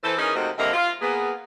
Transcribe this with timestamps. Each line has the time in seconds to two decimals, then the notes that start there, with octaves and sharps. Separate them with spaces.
0.04 E3 A4 C5
0.17 E3 C#4 D#4 G#4 A#4
0.36 C3 A3 A#3 D#4 F#4 C5
0.58 G2 D3 A#3 C4 D#5 E5
0.74 F4
1.02 A#3 B3 G#4